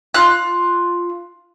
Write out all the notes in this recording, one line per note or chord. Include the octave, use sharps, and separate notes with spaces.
F4 F#6